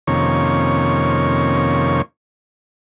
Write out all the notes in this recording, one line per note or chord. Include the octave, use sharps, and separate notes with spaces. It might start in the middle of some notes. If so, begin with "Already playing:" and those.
F2 C3 D#3 A#3 C#4 C#5